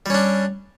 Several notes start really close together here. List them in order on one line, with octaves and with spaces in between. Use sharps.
G3 C#4 D4